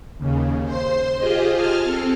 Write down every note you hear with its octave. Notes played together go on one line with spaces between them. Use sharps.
D#2 C#3
C5 C6
F4 G4 G#4 C5 D#5
G#5 A5 F6
C4 A4